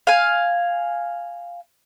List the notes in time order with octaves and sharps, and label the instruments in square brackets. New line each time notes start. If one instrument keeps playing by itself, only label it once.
[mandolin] F5 G#5